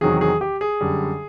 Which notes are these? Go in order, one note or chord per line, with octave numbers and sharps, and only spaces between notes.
E2 C3 D#3 F#3 G#4
G#4
G4
G#4
F#2 D3 G3